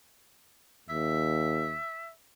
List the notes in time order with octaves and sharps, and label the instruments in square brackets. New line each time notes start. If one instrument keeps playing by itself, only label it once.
[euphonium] D#2 [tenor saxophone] E5